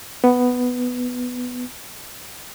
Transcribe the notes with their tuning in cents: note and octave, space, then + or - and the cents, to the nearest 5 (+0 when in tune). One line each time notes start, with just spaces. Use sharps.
B3 +5